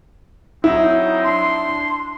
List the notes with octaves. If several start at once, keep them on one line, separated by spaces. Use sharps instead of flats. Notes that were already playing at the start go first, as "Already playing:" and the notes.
F#3 C4 D#4 E4
D4 C6